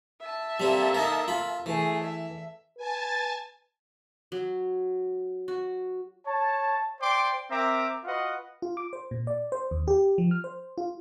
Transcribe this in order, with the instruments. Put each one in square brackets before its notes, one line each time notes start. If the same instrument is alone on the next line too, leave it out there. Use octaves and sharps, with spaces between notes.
[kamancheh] E5 A5
[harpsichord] G3 C4 [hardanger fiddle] A#3 A4
[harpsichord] D#4 A#4
F4 B5
[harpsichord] E3 [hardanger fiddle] A3 G#4
[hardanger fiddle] E5
[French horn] B4 [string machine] G#5 A5 A6
[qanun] F#3
F#4
[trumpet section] C#5 A5
C5 D5 G5 C6 D6
C4 A#4 E5 A#5 D6
F4 F#4 B4 D#5 F#5
[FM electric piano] F4
D6
C5
A#2
D5
C5
D#2
G4
F3
F6
C5
F4